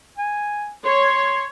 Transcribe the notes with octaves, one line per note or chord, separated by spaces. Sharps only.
G#5
C#5 C6